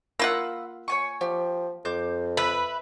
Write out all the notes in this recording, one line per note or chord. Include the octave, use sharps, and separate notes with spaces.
A#3 F4 F5 F#5 B5 E6
C#5 G#5 C#6
F3 G4
F2 C5 D6 G6
B4 E5